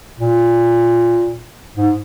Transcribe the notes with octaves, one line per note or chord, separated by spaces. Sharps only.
A#2
G#2